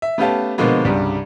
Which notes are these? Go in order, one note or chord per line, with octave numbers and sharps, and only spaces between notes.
E5
A3 B3 C#4 G4 F5 A5
B2 D3 F3 G#3 A#3 B3
C2 G2 C#3 G3